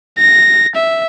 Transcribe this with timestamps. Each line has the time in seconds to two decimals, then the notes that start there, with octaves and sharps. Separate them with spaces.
0.19 A#6
0.75 E5